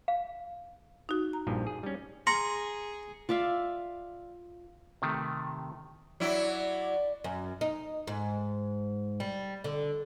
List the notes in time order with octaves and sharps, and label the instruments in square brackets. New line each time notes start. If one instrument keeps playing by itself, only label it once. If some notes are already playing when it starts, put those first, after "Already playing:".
[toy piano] F5
[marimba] D#4 F#4
A#5
[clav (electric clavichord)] A#1 G2 F3
G#4
G3 C#4
[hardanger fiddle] G#4 [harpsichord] A#5 [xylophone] C6 [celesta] C#7
[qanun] F4 D5 E5 F5
[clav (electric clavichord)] C3 D#3 A3
[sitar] F#3 E4 [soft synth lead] D5
[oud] F#2
D#4
G#2
G3
D3